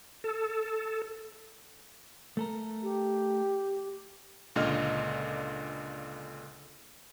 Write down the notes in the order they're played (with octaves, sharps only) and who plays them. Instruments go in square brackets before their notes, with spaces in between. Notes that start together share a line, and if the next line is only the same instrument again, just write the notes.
[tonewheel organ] A4
[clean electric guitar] A3 A4 A#4
[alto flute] G4
[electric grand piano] C#2 A#2 D3 A#3 D#5 F6